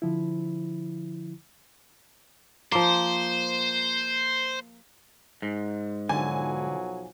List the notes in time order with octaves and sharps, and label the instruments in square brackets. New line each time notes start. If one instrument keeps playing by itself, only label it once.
[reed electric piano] D3 F3 E4
[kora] F3 A#3 [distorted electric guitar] C5
[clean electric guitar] G#2
[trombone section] B1 F3 F#3 [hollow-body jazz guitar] D3 [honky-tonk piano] G#5